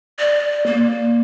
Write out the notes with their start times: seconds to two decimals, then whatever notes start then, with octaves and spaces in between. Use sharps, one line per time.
0.19 D5
0.66 A#3